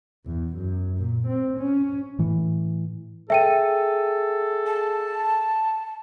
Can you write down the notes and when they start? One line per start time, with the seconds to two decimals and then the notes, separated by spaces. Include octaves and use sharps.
0.26 E2
0.56 F#2
0.98 A#2
1.28 C4
1.58 C#4
2.19 A2 E3
3.30 G#4 A4 E5 G5 D#7
4.66 A5